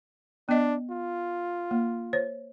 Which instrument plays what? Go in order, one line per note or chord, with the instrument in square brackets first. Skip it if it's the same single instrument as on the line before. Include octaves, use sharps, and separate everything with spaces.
[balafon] B3 D#5 [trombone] D4
[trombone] F4
[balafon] A#3
C5 C#5